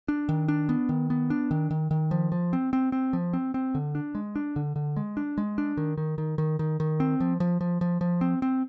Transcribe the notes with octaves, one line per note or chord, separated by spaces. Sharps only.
D4
D#3
D4
B3
D#3
B3
D4
D#3
D#3
D#3
F3
F3
C4
C4
C4
F3
C4
C4
D3
D4
G#3
D4
D3
D3
G#3
D4
G#3
D4
D#3
D#3
D#3
D#3
D#3
D#3
C4
F3
F3
F3
F3
F3
C4
C4